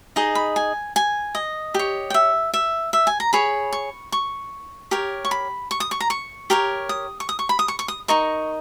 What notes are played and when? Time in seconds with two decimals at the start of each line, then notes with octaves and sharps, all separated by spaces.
0.16 D#4 G#4 D#5
0.35 B5
0.56 G#5
0.96 G#5
1.35 D#5
1.74 G4 C#5
2.10 G5
2.14 E5
2.54 E5
2.93 E5
3.07 G#5
3.20 A#5
3.33 G#4 C#5 B5
3.73 C#6
4.12 C#6
4.91 G4 A#4 C#5
5.25 C#6
5.31 B5
5.71 C#6
5.80 D#6
5.91 C#6
6.00 A#5
6.10 C#6
6.50 G4 A#4 C#5
6.89 D#6
7.20 C#6
7.29 D#6
7.39 C#6
7.49 B5
7.59 D#6
7.68 C#6
7.79 C#6
7.88 D#6
8.08 D#4 A#4 D#5 C#6